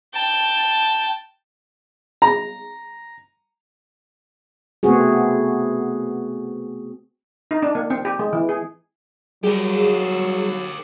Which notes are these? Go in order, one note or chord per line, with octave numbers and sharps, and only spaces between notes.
G5 A5
A#5
A3 B3 C4 F#4 G#4
D#4
D4
A#3
C4
G4
G#3
E3
G#4
F#3 G3 G4 G#4 A#4